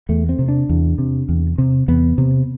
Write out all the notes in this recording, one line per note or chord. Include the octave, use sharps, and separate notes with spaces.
E2 A3
C4
C3
D4
E2
C3
E2
C3
E2 B3
C3